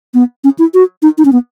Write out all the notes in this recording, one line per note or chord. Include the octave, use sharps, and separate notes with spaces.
B3
C#4
E4
F#4
D#4
D#4
C#4
B3